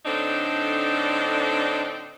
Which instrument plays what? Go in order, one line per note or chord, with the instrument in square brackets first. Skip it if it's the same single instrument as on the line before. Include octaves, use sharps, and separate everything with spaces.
[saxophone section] A2 D3 C4 D4 D#4